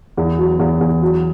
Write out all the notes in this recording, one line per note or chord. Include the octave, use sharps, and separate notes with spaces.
E2
F#3
E2
E2
F#3